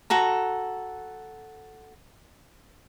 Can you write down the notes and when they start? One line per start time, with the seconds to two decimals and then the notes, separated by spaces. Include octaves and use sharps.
0.10 F#4 A4 A#5